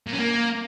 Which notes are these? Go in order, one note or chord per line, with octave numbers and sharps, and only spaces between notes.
A#2
C#4
A#3